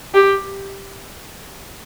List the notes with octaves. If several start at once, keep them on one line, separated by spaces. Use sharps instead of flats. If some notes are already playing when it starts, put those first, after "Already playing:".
G4